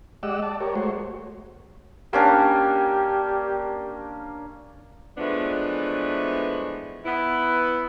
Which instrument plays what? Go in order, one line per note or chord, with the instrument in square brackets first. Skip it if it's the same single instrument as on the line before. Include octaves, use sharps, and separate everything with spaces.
[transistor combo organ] G#3 G4 D5 D#5 F#5 E6
D5 A5
G4 A#4 C#5
G#3 A3 F#4 C5 C#5
[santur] A#3 C#4 D4 [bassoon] G4
[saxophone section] E3 F3 G#3 A3 B3 D4
B3 E4